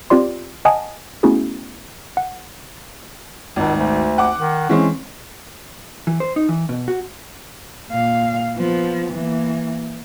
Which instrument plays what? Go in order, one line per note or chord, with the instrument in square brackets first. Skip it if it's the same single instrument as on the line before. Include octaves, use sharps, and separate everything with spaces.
[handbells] C4 F4 G4 D5 C6
D#5 F#5 G#5 A5 D#6
A3 B3 C#4 E4 F#4 G#4
F#5
[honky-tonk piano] G#1 [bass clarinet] C#2
[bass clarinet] D2
[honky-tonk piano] F#5 D6
[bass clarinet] D#3
[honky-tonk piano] E3 G#3 C4 [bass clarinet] C#4
[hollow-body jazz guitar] E3
C5
D#4
E3
B2
F#4
[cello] A#2 F5
F3 B3
E3 A#3